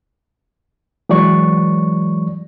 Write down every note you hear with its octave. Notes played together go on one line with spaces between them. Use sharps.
E3 F#3 G#3 D5 C#6